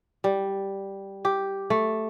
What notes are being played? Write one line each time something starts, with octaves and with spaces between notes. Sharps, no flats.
G3
G4
A3